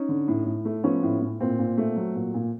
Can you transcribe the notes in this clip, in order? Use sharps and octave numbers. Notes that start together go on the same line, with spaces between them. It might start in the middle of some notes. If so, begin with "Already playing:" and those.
Already playing: C#4 D#4
D3
A2
A2
A3
F3 B3 C#4
A2
A2
A#2 C4
A#2
A3
F#3
A#2
A#2